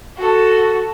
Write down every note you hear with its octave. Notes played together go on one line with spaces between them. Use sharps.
F#4 A4